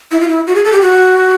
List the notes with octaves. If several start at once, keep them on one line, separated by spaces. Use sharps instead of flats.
E4
F4
E4
F#4
G#4
A4
G4
F#4